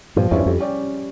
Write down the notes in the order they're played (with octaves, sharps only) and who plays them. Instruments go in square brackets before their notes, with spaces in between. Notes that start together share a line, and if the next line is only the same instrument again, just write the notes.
[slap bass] G2 A#2 [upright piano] F3
[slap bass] E2 G2 [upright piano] C#4 E4
[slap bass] F2 [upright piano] G3
[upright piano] C#4 G4 D5